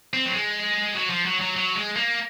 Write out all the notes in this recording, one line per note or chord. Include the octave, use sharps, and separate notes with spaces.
C4
F#3
G#3
F#3
F3
F#3
F#3
F#3
G#3
A#3